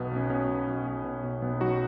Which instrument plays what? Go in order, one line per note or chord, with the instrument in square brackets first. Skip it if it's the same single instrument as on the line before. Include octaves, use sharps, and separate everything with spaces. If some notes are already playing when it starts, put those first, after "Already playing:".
Already playing: [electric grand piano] B1 B2 B3
B1 C#4
B2 C#4
B1
B1
B1
B2
B2
B1 B3
F#3 D#4 F#4